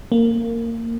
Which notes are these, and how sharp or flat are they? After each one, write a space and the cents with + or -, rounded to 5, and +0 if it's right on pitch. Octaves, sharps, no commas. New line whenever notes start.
A#3 -15